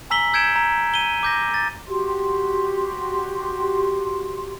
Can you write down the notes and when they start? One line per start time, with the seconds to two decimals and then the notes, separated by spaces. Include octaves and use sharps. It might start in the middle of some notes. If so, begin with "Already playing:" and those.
0.10 G#5 A#5 E6 B6 F#7 G7
0.33 E6 G6 G#6 C#7 D7 E7
0.56 A#5
0.94 D#7 G7
1.23 D6 G6 A#6
1.54 A6
1.88 F#4 G4 C6